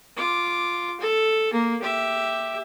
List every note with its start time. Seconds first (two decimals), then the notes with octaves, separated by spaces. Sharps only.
0.16 F4 D6
1.00 A4
1.53 A#3
1.82 G4 E5